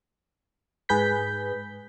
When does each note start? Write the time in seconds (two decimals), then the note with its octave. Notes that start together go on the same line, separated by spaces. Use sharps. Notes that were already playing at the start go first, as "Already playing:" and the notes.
0.89 G#2 G#4 B4 G6 B6